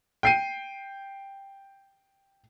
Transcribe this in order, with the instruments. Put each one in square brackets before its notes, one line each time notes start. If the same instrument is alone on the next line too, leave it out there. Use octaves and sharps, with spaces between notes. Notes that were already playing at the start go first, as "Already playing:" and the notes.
[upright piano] G5 C7 D#7